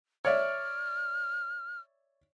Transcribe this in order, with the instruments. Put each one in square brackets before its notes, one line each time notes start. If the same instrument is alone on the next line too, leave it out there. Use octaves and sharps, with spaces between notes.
[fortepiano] C#5 D5 E5 [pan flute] F6